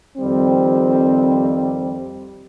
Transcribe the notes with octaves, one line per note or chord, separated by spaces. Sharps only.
F2 D#3 G3 C4